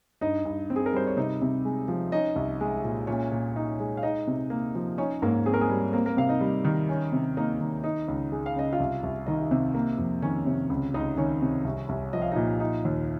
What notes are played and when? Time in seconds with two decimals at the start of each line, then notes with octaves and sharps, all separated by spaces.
0.21 G2 D#4 D#5
0.45 G2
0.70 C4
0.76 G#4
0.86 A#4
0.93 G3 C5
1.07 C#5
1.17 C3 D#4 D#5
1.41 C3
1.65 G#3
1.88 F3
2.12 C#4 D#4 D#5
2.36 C2
2.61 G#3
2.84 A#2
3.07 A#2 C#4 C#5
3.32 A#2
3.56 D#4
3.80 G#3
3.97 F5
4.03 D#4 D#5
4.27 C3
4.50 A#3
4.75 F3
4.98 C#4 D#4 C#5
5.22 G#2 A#3 A#4
5.46 C4 G#4
5.54 A#4
5.61 G#3 G#4
5.69 G3
5.93 A#3 C4 A#4
6.06 A#3 A#4
6.17 C3 F5
6.29 D#4 D#5
6.41 G3
6.65 D#3
6.89 C#4
7.12 C3
7.37 A#3 D#4 D#5
7.60 D#3
7.84 D#4
8.08 C#2
8.32 G#3
8.46 F5
8.56 C#3 D#5
8.73 F4 F5
8.80 C2
9.03 C2
9.26 D#3 D#4 D#5
9.51 C3
9.74 A#3
9.98 F2
10.22 D#3 C#4 C#5
10.46 C3
10.70 C#2
10.94 C#2 D#4 D#5
11.17 D#3 C#4 C#5
11.42 C3
11.65 C2
11.89 C2
12.13 F3 D#5
12.22 F5
12.31 A#2 D#4 D#5
12.60 D#4
12.85 D#2